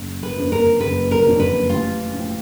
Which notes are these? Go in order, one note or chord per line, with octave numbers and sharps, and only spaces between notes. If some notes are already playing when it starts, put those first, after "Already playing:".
Already playing: F#1
B4
F2 D3 F3 A#3
A#4
F#1 B4
A#4
F2 D3 F3 A#3
B4
A1 F4
A2 F3